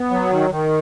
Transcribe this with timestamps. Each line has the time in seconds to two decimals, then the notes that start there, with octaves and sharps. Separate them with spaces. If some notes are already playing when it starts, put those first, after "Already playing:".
Already playing: B3
0.10 F#3
0.31 D#3
0.50 D#3